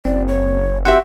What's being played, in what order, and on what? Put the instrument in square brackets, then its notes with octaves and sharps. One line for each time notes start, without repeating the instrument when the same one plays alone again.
[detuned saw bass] F#1 [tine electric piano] C4 [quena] D5
[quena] C#5
[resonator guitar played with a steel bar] C4 F#4 E5 [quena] G4 [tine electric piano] F#5